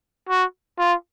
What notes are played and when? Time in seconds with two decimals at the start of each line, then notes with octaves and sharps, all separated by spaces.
0.29 F#4
0.79 F4